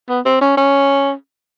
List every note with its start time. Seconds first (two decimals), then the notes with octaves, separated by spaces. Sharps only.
0.09 B3
0.26 C4
0.41 C#4
0.57 C#4